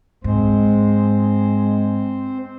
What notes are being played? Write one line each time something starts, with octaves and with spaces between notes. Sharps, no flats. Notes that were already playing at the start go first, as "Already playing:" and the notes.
G#2 G#3 C4 C5